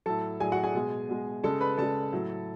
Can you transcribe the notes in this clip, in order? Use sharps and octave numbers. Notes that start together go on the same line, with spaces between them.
A2 F#3 A4 A5
A2 F#3 G#4 G#5
F#4 F#5
G#4 G#5
B2 G#3
B2 G#3
C#3 G#3 A4 A5
B4 B5
C#3 G#3 A4 A5
A2 F#3